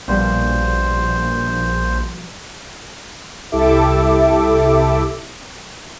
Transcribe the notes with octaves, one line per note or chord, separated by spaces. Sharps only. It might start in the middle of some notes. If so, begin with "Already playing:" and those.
A#1 B2 F3 G3 C5
C2 E4 G4 A4 E5 D6